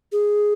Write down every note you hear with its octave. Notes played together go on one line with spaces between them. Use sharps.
G#4